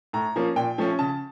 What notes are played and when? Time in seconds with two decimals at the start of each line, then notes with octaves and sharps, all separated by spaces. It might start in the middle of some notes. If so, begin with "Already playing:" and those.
0.13 A2 A#5
0.36 F3 A#3 C#4
0.56 A#2 G5
0.78 F3 A3 C#4
0.99 C#3 A5